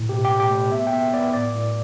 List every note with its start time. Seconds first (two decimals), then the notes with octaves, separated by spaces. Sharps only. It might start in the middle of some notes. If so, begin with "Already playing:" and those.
Already playing: A2
0.09 B2 G4
0.25 G4
0.30 A3
0.40 G4
0.51 A3
0.71 B3 E5
0.87 G5
0.92 B3 E5
1.13 B3 D5
1.34 A2 D5
1.55 A2